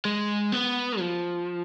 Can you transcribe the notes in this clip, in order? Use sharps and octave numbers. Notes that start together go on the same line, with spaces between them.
G#3
B3
F3